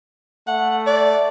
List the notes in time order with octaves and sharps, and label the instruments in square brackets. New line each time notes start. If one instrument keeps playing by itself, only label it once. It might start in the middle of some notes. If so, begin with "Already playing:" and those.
[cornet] A3 [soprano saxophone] F#5
[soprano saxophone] D5